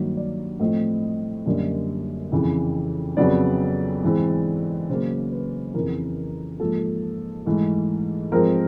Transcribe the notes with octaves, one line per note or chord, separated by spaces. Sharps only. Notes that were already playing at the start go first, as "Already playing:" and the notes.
Already playing: G2 D#3 F#3 A#3
D5
A2 F3 A3 C4 D#5
F#2 D3 G3 A#3
F2 C#3 E3
F2 C#3 F#3 B3 D5
G#2 E3 G#3 C4
C#3 F#3 A#3 C5
B4
F2 C#3 E3 A#4
G#2 F3 A#3 A4
G#2 E3 A3
G#2 F3 G#3 C4 A#4